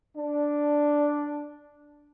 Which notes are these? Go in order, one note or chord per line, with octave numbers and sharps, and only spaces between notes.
D4